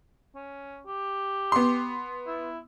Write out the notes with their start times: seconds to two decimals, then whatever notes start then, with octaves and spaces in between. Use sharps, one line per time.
0.35 C#4
0.86 G4
1.52 B3 C6
2.27 E4